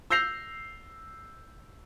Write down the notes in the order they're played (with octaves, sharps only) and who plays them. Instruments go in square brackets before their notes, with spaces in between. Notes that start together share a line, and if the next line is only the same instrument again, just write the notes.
[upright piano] E6 G6 A#6 C7 F7